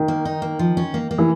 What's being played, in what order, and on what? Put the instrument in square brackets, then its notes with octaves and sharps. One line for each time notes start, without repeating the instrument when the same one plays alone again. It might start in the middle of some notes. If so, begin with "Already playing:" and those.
Already playing: [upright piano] D#3
[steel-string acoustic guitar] A#3
D#4
A#3
F3
C#4
A#3
A#3
[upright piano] E3